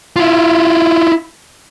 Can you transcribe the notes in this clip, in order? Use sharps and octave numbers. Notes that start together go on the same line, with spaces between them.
E4 F4